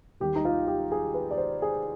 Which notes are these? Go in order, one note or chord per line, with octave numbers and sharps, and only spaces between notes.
D#2 D#3 G3 G4
D#4
F4
G4
G#4
B4
D5
C5
G#4